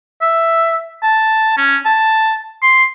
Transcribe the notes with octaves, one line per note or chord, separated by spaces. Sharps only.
E5
A5
C#4
A5
C6